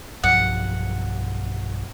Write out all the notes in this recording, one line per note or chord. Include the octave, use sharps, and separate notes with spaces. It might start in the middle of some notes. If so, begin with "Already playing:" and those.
B1 G2 F3 F#5